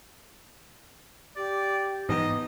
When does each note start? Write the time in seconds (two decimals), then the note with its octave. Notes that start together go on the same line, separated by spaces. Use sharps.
1.36 G4 D5
2.09 G#2 E3 B3 D#4 D#5